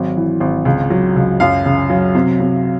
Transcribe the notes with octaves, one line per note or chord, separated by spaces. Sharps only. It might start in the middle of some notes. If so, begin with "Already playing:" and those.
Already playing: G#1 F#3
E3
G#1
C#2
F#3
C#2
F#2 F5
C#3
F#3
C3
C3